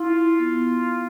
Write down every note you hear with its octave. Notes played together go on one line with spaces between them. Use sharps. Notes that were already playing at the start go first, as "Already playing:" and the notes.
Already playing: E4 F4
B3